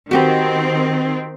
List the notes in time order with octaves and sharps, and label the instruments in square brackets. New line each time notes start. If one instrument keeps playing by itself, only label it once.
[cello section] D#3 C4 [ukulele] F#4 G4 B4